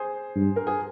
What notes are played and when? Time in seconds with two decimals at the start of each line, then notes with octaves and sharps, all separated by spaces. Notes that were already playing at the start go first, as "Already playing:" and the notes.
Already playing: G#4 C5
0.36 G2
0.56 A#4
0.67 G#4